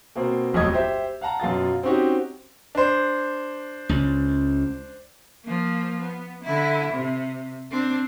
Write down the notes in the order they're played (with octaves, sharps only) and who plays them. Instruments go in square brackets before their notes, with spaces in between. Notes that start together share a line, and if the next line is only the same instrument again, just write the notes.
[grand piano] B2 A#3 C4
D#1 B1 F2 A2 D#5 G#6
G4 C5 E5
F5 F#5 A5 A#5
F#2 B2 F4 A6
C4 C#4 D#4 F#4 G4
D4 C5
[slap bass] C#2
[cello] F3 A#3
B3
D3 E4
C3
C4 D4